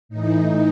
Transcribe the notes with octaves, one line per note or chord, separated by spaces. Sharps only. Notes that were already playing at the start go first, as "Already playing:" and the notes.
A2 E3 D#4